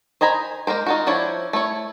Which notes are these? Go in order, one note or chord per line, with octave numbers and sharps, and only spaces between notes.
C5 D#5 G#5 A#5 B5
G#3 A#3 A#4 C5
D#4 F4 F#4
F3 D4 E4 C5 C#5
A3 E4 C#5